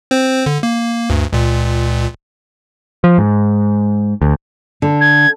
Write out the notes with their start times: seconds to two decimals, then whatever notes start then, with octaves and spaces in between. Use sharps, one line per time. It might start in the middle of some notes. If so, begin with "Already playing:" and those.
0.11 C4 C5
0.46 D3
0.63 A#3
1.10 D2 G2
1.33 C#2 A#2
3.04 F3
3.18 G#2
4.22 D2
4.82 D3
5.01 G#6